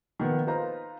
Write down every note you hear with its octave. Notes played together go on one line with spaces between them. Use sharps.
D#3 F3 A#3 B3
D#4 F4 B4 C5 A#5